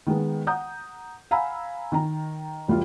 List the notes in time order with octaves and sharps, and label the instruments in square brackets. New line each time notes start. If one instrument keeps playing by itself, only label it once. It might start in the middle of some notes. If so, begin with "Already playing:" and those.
[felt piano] D#3 G#3 B3
F#5 A#5 D#6 G6
F5 F#5 G#5 A#5 B5 E6
D#3 A#5
E1 G3 E4 F4 G4